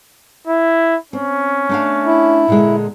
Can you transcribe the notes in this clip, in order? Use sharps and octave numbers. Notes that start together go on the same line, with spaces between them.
E4
C4 C#4
A3 D4 F5
E4
A#2 D3 G#3